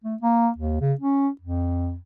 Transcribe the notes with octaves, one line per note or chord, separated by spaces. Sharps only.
A3
A#3
D#2
C#3
C#4
F2